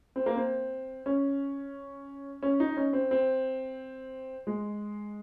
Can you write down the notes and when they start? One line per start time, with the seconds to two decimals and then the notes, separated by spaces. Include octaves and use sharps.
0.16 C4
0.26 A#3
0.36 C4
1.06 C#4
2.43 C#4
2.60 D#4
2.77 C#4
2.93 C4
3.11 C4
4.47 G#3